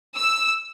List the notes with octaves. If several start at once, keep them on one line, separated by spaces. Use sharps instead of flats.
E6